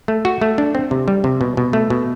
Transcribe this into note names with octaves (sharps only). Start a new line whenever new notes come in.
A3
F#4
A3
D4
C4
C3
G3
C3
B2
B2
A3
B2